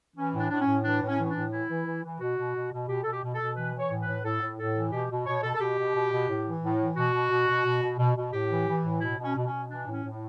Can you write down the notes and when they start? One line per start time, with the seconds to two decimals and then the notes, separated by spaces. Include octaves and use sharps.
0.16 E3 C#4
0.34 A2
0.40 D4
0.51 A2 D4
0.61 C#4
0.67 A2
0.84 E3 D4
1.02 A2
1.08 C#4
1.18 E3
1.26 C#4
1.30 D4
1.36 A2
1.52 E3 E4
1.70 E3
1.86 E3
2.04 E3
2.20 B2 F#4
2.38 B2
2.55 B2
2.72 B2
2.88 B2 G4
3.04 B2 A4
3.12 G4
3.23 B2
3.35 A4
3.40 B2
3.57 E3 B4
3.74 E3
3.79 C#5
3.90 A2
4.03 A2 B4
4.24 A2 A4
4.41 A2
4.59 A2 A4
4.76 E3
4.92 B2 G4
5.10 B2
5.26 B2 C#5
5.43 B2 A4
5.54 A4
5.61 B2 G4
5.79 B2
5.95 B2
6.13 B2
6.29 A2
6.46 E3
6.64 A2
6.80 E3
6.97 B2 F#4
7.14 B2
7.31 B2
7.48 B2
7.65 B2
7.82 B2
7.99 B2
8.16 B2
8.33 A2 G4
8.51 E3
8.67 E3
8.84 A2
9.01 B2 E4
9.18 B2
9.23 C#4
9.36 B2
9.47 C#4
9.52 B2
9.69 E3 D4
9.87 A2
9.92 C#4
10.04 A2